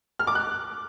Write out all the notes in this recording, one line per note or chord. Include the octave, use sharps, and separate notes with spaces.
F6
D6
F#6